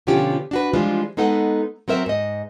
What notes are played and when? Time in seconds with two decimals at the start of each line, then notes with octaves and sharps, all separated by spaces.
0.07 B2 D3 F3 C#4 F4 G4
0.51 D4 F#4 B4
0.73 E3 F3 G3 G#3 D4 F4
1.17 G#3 B3 D#4 A4 B4 F#5
1.88 F#3 C4 A#4 E5
2.06 G#2 D#5